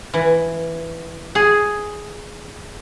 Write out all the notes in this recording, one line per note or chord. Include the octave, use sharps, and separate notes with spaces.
E3
G#4